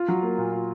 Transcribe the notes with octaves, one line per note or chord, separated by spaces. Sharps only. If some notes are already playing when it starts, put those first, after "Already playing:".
Already playing: F4
F#3
A#3
A#2
F4